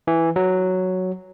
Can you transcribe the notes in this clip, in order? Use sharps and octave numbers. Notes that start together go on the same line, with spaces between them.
E3
F#3